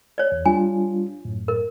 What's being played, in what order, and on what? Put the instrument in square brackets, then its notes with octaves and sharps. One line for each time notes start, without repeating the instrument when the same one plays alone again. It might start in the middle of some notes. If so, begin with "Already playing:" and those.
[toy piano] C#5 D5
[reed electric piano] E2
[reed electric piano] G3 D4 F4 [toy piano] G#5
[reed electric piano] F#2 A2
[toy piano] A#4